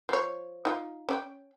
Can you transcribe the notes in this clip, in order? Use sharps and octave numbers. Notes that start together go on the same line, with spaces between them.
F3 C#5
D#4 F4
C#4 D5 G5